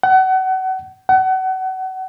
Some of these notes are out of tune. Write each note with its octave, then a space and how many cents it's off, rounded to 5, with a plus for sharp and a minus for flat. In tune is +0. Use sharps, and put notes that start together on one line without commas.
F#5 +30
F#5 +30